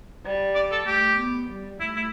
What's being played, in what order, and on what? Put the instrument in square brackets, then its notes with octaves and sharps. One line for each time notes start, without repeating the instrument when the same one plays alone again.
[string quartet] G3
[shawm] D5
A4
[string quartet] A3 [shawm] G4
[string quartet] B3
G3
[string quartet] A3 [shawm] E4
[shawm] E4